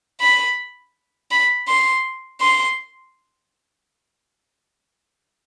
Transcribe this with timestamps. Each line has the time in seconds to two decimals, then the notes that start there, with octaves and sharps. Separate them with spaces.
0.21 B5
1.31 B5
1.67 C6
2.40 C6